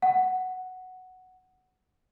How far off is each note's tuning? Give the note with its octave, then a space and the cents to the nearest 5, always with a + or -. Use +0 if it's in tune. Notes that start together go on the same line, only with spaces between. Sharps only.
F#5 +0